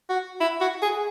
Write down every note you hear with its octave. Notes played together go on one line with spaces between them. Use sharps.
F#4
E4
F#4
G#4